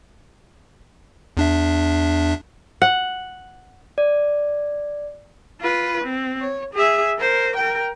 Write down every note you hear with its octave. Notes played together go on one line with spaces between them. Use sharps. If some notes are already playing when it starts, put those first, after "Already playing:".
E2 D4 E5
F#5
D5
F4 B4
C4
C#5
G#4 E5
A#4 C5
A#4 G5